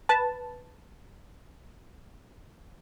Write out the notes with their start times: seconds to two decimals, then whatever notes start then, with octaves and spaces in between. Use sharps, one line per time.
0.09 B4 A5